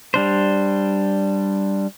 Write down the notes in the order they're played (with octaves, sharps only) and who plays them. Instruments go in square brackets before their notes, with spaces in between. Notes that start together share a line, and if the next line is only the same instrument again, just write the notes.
[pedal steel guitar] G3 D4 C5